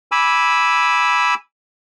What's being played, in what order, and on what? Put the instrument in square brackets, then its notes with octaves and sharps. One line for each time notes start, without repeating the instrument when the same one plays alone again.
[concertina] G#5 B5 D6 E6